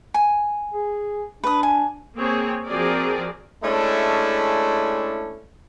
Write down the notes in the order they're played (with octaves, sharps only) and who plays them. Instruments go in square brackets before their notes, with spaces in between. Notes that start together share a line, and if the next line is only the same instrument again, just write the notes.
[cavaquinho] G#5
[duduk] G#4
[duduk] D4 [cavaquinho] B4 D#6
[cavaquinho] G#5
[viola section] A#3 C4 G#4 C#5
F3 C4 F#4 G#4 A#4 D5
[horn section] G#3 A3 C#4 D4 E4